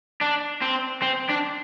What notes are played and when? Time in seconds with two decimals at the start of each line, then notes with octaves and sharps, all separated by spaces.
0.21 D4
0.62 C4
1.02 C4
1.30 D4